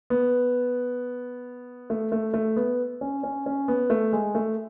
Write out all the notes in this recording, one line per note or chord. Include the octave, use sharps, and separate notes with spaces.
B3
A3
A3
A3
B3
C#4
C#4
C#4
B3
A3
G#3
A3